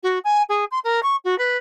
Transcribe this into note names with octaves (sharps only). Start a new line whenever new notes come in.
F#4
G#5
G#4
C6
A#4
C#6
F#4
B4